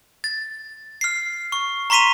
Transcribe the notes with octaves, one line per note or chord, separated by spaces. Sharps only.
A6
F6 C7
C#6
A#5 C6 C#6 B6 D#7 F7